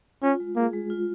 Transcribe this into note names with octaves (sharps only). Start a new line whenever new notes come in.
C#4 F4
G#3
A#3 G#4
G#3
F4